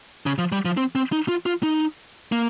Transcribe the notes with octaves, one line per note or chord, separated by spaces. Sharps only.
C#3
F3
G3
F3
C4
C4
D#4
F4
F4
D#4
A#3